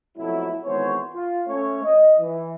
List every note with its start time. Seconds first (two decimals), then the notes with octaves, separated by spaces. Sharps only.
0.18 F2 B2 F#3 A3 E4
0.64 G#1 E3 B3 G#4 C5 C#5
1.14 F4
1.48 A3 C#4 C#5
1.84 D#5
2.20 E3